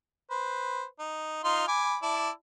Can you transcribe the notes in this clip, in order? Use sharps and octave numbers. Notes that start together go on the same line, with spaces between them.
B4 C5
D#4
D#4 F4 C6
G#5 B5 D6
E4 D5 A5